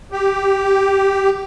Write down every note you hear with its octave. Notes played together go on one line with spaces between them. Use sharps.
G4